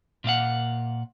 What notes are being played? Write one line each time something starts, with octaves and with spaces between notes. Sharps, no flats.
A#2 A#3 F5 F#5